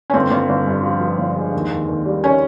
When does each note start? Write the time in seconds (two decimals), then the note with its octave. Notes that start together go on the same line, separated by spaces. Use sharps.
0.10 C#4
0.14 G1 C4
0.31 G1
0.49 G1
0.67 G2
0.83 F3
1.01 F3
1.19 G1
1.36 G#3
1.53 D#2
1.71 D#2
1.88 D#2
2.05 G3
2.24 G3 C#4